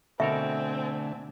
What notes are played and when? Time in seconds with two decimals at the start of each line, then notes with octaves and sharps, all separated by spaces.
0.20 B2 D3 A3 C4 A4 A#4 E5 G#5